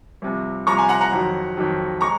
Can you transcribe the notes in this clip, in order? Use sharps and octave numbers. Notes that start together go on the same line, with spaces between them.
C2 C3 F3
C2 C3 F3 A#5 C#6
G#5 C6
F#5 A#5
F#5 A#5
F2 D#3 F#3
F2 D#3 F#3
G#3 A#5 C#6